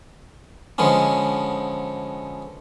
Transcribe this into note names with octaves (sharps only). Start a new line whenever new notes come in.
D3 F3 G#3 B3 C#4